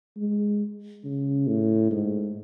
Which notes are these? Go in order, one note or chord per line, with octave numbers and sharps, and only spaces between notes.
G#3
C#3
A2
G#2